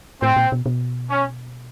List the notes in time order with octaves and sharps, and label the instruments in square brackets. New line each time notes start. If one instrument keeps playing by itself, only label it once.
[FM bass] A2 [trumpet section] C4
[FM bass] A#2
B2
B2
[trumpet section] C#4